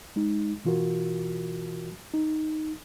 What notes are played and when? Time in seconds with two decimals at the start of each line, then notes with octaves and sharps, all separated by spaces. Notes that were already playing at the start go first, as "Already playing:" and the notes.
0.16 G#3 D#4
0.65 B2 E3 F4 F#4 A#4
2.14 D#4